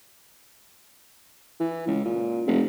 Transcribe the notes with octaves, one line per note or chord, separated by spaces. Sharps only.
E3
C#2
A#2
F1